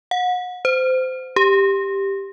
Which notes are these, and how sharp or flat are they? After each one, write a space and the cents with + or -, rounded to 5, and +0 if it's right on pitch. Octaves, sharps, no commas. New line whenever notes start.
F#5 -35
C5 -25
G4 +5